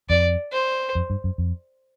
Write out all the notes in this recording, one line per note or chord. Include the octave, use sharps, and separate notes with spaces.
F2 D5
C5
F2
G2
F#2
F2